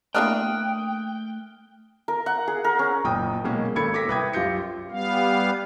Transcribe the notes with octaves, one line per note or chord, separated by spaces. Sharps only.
A3 A#3 D4 E4 G5 D#6 F6 F#6
A#4
F#5
G#4
A#4
C#4
F#1 A#2 G5 D#6
B2 F#3 G#3 A#3 C#4
G#1 A#3 A4 B5 G#6 C#7
A4 D6 A#6 B6
C2 B4 E5 G5 D#6 G#6
F#2 F4 G4 G6 A#6 C#7
G3 B3 F5